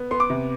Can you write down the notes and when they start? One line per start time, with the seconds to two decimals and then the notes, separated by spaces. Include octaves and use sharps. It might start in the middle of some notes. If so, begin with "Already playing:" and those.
Already playing: B3
0.11 B3 C6
0.20 D6
0.30 C3